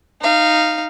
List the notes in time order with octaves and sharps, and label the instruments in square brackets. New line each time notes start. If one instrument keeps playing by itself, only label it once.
[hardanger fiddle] D#4 F5